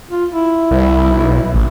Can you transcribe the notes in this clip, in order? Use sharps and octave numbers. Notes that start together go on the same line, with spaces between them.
F4
E4
C2
B1
A1